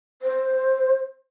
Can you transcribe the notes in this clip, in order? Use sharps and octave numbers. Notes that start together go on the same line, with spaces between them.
C5